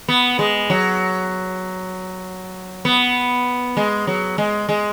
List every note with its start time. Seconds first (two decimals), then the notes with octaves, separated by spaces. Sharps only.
0.08 B3
0.39 G#3
0.70 F#3
2.85 B3
3.77 G#3
4.07 F#3
4.38 G#3
4.69 G#3